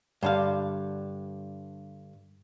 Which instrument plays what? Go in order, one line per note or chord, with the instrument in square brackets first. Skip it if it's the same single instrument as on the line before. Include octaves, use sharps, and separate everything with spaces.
[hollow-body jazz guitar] G2 D3 F5